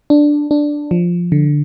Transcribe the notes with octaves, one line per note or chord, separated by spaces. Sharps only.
D4
D4
F3
D3